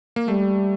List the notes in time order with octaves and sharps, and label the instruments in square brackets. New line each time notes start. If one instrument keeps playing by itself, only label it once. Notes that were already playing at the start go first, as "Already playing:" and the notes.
[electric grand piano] A#3
[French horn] G3 [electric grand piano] A3